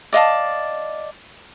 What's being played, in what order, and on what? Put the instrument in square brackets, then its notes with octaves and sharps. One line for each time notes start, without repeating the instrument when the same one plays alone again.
[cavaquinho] D5 D#5 F5 A5